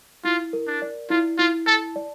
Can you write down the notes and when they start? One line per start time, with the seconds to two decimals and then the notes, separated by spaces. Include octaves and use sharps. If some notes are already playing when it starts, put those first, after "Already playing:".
0.24 E4 F4
0.53 A#4
0.67 D4
0.82 D5
1.10 E4 F4
1.38 E4 F4
1.66 A4 A5
1.96 D5